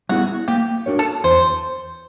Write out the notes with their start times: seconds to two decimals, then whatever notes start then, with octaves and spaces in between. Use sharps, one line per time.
0.09 G3 B3 E4 F#4 G#4
0.48 A#3 G4
0.86 D4 F#4 A#4 C#5
0.99 A4
1.24 E2 C5